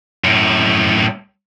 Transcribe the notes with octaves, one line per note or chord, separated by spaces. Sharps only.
F#2 A2